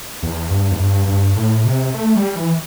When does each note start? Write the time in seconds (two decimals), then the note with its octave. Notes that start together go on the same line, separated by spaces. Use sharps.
0.23 E2
0.50 G2
0.71 E2
0.79 G2
1.08 G2
1.36 A2
1.65 C3
1.94 A3
2.15 G3
2.36 E3